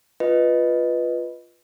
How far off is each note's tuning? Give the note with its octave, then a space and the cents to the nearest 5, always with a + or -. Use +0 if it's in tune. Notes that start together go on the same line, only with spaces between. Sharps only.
F4 +0 B4 -5 D#5 +0